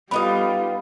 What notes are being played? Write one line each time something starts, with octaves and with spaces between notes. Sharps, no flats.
G3 B3 D#4 F4 A4 F5 B5